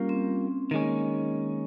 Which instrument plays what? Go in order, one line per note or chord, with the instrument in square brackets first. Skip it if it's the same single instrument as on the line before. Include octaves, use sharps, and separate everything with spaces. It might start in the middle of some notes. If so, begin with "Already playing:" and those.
Already playing: [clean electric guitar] G3 A#3 F4 A#4 [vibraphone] C#4
[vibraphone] C4
[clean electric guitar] D#3 G#3 C#4 [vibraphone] A#3